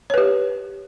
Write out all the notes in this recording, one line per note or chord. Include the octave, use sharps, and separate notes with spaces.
G4 B4 C#5